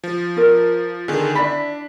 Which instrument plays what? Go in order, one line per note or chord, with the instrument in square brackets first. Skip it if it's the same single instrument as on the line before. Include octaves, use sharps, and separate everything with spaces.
[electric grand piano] F3
[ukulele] F4 A#4
[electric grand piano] D3 D#3 [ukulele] G#4
[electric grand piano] D4 B6 [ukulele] E4 D5 B5